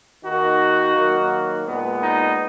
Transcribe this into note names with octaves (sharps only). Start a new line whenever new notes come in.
D#3 A#3 D#4 F#4
D#3 F#3 A#3
A#2 G#3 B3
D#4